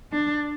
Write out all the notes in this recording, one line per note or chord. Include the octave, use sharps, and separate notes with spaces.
D4